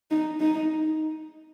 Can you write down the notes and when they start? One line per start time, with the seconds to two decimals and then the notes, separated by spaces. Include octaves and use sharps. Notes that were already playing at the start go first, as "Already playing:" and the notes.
0.11 D#4
0.40 D#4